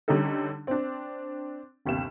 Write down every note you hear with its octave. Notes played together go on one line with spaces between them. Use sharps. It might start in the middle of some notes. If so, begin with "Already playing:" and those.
D3 G3 C#4 D#4 A4
C4 D4
G1 D#2 C3 E7